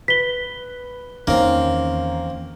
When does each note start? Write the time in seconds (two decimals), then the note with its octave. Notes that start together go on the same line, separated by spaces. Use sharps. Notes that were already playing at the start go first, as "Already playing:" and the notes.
0.08 B4 B6 G7
1.27 E2 D#3 A#3 C4 C#4